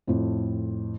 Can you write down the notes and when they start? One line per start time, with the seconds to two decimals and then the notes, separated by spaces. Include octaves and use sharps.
0.07 F2 A2